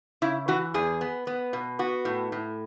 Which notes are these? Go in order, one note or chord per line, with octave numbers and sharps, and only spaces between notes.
C#3 E4
E3 F#4
E2 G#4
B3
B3
B2
B3 F#4
A2
A2